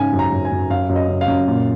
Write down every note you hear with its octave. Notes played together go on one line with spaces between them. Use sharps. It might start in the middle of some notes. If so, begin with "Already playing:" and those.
Already playing: G#2 C#3 G#5
F#2
A#5
F#2
G#5
F#2
F#2 F5
F#2
D#5
C#3
F5
F#2
A#2